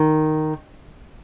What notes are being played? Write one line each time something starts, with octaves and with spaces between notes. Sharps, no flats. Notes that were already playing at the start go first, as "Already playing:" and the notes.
Already playing: D#3